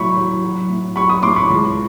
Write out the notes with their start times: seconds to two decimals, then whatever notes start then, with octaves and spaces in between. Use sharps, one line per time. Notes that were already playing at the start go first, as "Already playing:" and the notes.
Already playing: A2 F#3 B5 C#6
0.17 F#3
0.44 F#3
0.70 A2
0.96 F#3 B5 C#6
1.09 C#6 D#6
1.23 A2 C6 D6
1.36 B5 C#6
1.50 C#2